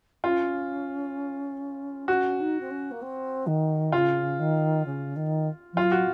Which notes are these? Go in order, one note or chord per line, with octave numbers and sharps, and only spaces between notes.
C#4 F4
C#4 F#4
D#4
C4
C#4
A#3
C4
D#3
C#3 F4
D#3
C#3
D#3
F3
F#3 F4
F#4